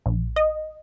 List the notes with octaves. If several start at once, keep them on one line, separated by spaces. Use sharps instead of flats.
A#1
D#5